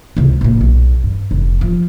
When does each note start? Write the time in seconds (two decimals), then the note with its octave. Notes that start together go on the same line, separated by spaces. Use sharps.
0.17 C#2 C3
0.41 A#1 A#2
0.61 B1
1.04 G2
1.31 F1
1.61 F3